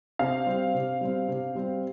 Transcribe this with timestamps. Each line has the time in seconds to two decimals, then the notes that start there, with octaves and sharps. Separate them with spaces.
0.19 C3 F5
0.46 G3 C4
0.74 C3
1.01 G3 C4
1.28 C3
1.55 G3 C4